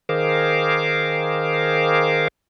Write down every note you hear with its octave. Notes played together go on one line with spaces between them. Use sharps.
D#3 G#4 A#4 C5 F5 D6